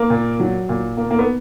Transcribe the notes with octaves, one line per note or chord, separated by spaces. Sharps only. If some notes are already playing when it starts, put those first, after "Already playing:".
Already playing: A#3
A#2
F#3
A#2
A#3
A#3
B3